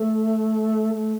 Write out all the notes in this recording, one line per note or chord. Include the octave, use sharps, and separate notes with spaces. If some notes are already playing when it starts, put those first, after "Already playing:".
Already playing: A3
A3